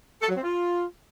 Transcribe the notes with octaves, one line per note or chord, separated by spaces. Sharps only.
A4
F#3
C4
F4